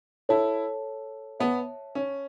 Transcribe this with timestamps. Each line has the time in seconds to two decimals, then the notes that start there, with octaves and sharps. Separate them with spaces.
0.29 E4 A4 C#5 A5
1.40 B3 C#5 E5 A5
1.95 C#4